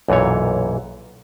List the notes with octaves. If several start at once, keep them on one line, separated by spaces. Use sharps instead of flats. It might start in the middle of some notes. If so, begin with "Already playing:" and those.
B1 F#2 A#2 E3 C#5